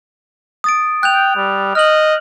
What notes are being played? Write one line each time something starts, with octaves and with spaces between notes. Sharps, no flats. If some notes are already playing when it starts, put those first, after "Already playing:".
D#6 A6 D7
G5 F#6 G6 F7
G3
D#5 F6 F#7